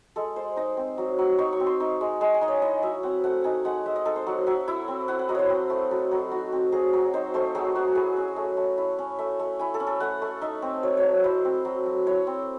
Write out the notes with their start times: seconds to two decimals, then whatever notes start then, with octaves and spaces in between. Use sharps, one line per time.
0.16 G#3 A4
0.36 G#3 C5
0.57 D#4 D#5
0.77 C4
0.98 F#3
1.19 F#3
1.38 D#4 C#6
1.53 C#6
1.60 C4
1.67 C6
1.80 D#4 C#6
2.01 G#3
2.21 G#3 C6
2.34 G#5
2.41 D#4 D#5
2.48 C#5
2.62 E4 D#5
2.82 F#3 E5
3.03 C4 F#5
3.24 A3 F#5
3.44 D#4 G#5
3.64 G#3 F#5
3.86 G#3 E5
3.96 D#5
4.05 D#4 A4
4.16 C5
4.27 F#3
4.47 F#3 E5
4.68 E4 E5
4.88 C4
5.08 E4 F#5
5.19 F#5
5.29 F#3 D#5
5.35 C5 C#5
5.50 C4
5.70 A3
5.91 F#3 A4
6.11 F#3
6.31 D#4 F#4
6.52 C4
6.72 F#3 G#4
6.93 F#3
7.13 D#4 C5
7.34 A3 C5
7.55 F#3 G#4
7.75 F#3 F#4
7.95 E4 G#4
8.17 C#4
8.36 A3
8.57 A3
8.77 E4
8.99 C#4
9.19 A3 E5
9.39 A3
9.59 E4 G#5
9.74 A4
9.80 C#4
9.87 A4
10.00 A3 F#5
10.22 A3
10.41 D#4 E5
10.62 C4
10.83 F#3 C#5
10.97 C#5
11.04 F#3
11.24 E4 C5
11.45 C4
11.65 F#3
11.86 F#3
12.06 E4 C#5
12.27 C4